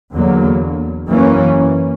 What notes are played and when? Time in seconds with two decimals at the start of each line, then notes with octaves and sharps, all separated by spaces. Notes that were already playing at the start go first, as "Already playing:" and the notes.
0.13 E2 D3 F#3 A#3
1.09 F#2 E3 A#3 C#4